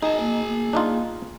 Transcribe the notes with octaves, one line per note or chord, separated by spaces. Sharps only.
D#4 G#4 D#5 G#5 A5
A#3
A#3
D4 D#4 F4